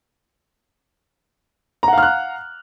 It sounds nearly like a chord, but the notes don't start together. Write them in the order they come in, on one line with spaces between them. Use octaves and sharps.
A#5 F#5 F5 F6 F#6